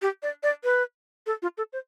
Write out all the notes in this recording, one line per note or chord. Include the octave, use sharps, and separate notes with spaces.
G4
D5
D5
B4
A4
F4
A4
C5